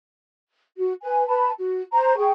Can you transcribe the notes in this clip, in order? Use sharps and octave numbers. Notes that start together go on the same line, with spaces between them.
F#4
B4 G#5
B4 A5 B5
F#4
C5 A#5
G#4 G5 C#6